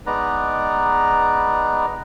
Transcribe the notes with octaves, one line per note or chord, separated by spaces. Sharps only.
G#3 B3 D#4 B4 D5 A#5